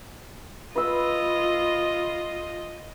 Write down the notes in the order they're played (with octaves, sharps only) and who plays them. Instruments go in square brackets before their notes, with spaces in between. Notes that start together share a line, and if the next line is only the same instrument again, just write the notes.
[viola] F4 D#5 [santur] B4 C6 E6